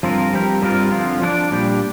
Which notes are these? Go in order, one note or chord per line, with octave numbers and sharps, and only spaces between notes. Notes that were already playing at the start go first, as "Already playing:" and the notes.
G2 F3 C4 F4 A#4
G3 C4 G4 A#4
G2 G3 C4 F4 A#4
D3 F3 C4 F4
F3 D4 A#4 D5
A#2 G3 D4 G4